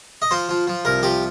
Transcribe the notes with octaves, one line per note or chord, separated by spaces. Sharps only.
D#5
F3 C5
F3
F3
C2 A#4
F3 G4